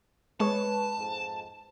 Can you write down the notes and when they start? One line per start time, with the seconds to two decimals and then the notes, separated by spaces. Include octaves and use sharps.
0.40 G#3 G#4 B4 C#5 A5
0.98 F2 G#2